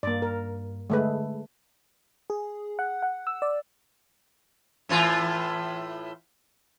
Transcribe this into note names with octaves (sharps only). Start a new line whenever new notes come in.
G2 A#3 D5
A#4
D3 G#3 A3 B4
G#4
F#5
F#5
E6
D5
A2 E3 F4